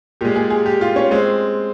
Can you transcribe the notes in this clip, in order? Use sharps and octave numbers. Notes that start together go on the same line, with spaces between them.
A#2 G#3 G4
G#4
G#4
G4
F4
C#4
G#3 C4